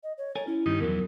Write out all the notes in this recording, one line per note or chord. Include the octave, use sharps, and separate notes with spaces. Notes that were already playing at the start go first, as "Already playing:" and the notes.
D#5
C#5
A4 A#4 C#5 G#5
C#4 E4
G2 D#3 D#4
E2 B2 F3 F#3 A#4